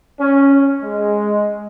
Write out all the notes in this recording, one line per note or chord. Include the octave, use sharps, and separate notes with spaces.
C#4
G#3